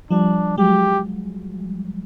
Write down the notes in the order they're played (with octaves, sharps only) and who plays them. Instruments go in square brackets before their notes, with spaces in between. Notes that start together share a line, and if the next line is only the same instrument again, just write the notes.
[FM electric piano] F3 G3 [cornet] D4
[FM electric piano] F#3 G#3 [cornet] G4